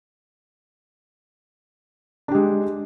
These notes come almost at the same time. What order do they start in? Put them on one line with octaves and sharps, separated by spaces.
D4 G4 G#3